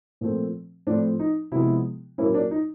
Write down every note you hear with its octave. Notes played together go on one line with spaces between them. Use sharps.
A#2 F3 A3 C4
A2 F3 A3 C4 D4
D#4
C3 F3 G#3 B3 E4
A#2 F#3 A#3 C#4 E4
D4
D#4